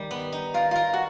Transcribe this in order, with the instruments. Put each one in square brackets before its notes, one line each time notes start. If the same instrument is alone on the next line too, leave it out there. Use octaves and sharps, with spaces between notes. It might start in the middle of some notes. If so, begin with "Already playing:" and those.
Already playing: [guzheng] D#3 G3
B3
D#4
[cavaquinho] F4 [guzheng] A#4
[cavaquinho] F4 [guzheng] A#4
[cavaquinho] F#4